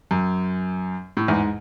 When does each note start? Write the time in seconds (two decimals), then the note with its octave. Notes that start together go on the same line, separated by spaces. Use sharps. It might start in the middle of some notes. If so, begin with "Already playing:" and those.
0.11 F#2
1.17 A2
1.28 E2 G#2